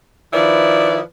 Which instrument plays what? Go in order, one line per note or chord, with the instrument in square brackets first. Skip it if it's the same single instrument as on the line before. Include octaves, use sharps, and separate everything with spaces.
[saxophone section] D#3 F3 E4 B4 D5